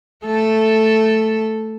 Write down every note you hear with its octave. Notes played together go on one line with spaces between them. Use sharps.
A3 A4